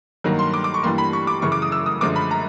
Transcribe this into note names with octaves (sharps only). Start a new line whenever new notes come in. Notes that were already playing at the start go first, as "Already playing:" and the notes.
G2 D#3 F#3 A#3
C6
D6
D6
C#6
G2 E3 G3 A#3 C6
B5
C#6
D6
F#2 C#3 E3 C#6
D6
D#6
E6
D#6
F#2 D3 F3 G#3 D6
B5
A#5